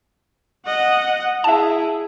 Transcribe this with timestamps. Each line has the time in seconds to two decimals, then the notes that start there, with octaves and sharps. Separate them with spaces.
0.66 D#5 F#5
1.44 E4 G#4 E5 A5